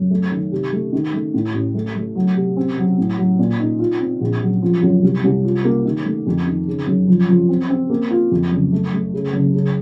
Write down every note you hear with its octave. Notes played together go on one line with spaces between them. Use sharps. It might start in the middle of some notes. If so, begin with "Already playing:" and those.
Already playing: F#2
A3
D#3
C3
A3
D#3
A3
A2
A1
A3
A3
F#3
C3
C4
F#3
A2
F#3
A#2
D#4
F4
C4
A#1
F#3
F3
F#2
C2
C2
F4
A#3
D#3
A3
F2
D#3
C#3
F#2
F3
F3
C4
C4
A#3
F4
F2
F#1
A3
A3
C#3
F#1
C#3